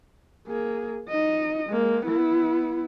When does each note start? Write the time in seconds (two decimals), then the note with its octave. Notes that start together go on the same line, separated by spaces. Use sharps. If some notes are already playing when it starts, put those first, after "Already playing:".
0.48 A#3 G#4
1.09 D#4 D#5
1.70 G#3 A#3
2.05 B3 E4